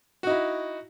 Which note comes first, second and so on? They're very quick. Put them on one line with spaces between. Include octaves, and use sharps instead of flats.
F#4 D#4 E4